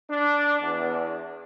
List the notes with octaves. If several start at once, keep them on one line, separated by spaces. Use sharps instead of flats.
D4
E2